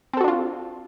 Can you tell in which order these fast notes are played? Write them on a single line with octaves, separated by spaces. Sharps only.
C4 A4 F#4 D4 F4